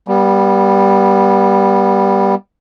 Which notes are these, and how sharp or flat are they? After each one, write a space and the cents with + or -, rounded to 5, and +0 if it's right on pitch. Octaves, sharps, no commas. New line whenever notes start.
G3 +0 B3 -30